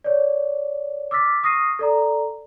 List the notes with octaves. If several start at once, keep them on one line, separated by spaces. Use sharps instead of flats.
C#5 D5
D6 E6 F6 A6 B6
C#6 D#6 F6 A#6 C7 D#7
A4 D5 A#5